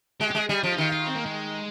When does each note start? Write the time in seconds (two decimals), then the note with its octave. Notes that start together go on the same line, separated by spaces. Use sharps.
0.20 G#3 G4
0.30 G4
0.35 G#3 G#4
0.49 G3 G#4
0.63 F3 F4
0.72 D#4
0.78 D#3 F4
0.92 F4
1.07 C4
1.16 A#3
1.26 G#3